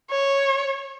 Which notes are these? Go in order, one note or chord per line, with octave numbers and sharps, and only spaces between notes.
C#5